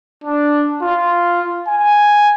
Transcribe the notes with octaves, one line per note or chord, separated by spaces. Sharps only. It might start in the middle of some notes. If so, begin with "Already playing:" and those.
D4
F4
G#5